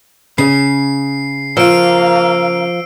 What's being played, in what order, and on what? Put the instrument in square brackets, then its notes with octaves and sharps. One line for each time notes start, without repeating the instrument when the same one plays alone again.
[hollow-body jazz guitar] C#3 [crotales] C7
[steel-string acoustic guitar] F3 [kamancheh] A#3 F5 [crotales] E6 D7